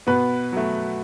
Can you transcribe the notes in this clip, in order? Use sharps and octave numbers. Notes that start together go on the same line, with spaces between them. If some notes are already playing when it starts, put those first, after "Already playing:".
B2 B3 B4
F#3 A3